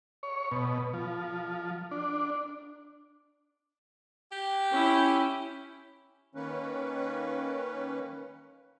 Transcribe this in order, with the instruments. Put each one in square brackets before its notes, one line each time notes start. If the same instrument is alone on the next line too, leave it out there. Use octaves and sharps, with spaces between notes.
[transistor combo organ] C#5
B2
F3
D4
[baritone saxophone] G4
[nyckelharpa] C#4 E4
[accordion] D#3 A#3 C#4 B4